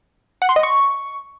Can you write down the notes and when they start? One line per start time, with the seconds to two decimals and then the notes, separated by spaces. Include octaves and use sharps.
0.42 F#5
0.49 C6
0.56 D#5
0.63 C#6